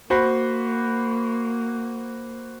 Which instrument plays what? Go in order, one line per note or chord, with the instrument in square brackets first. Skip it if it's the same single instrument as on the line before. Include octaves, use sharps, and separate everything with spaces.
[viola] A#3 [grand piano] F#4 C5 B5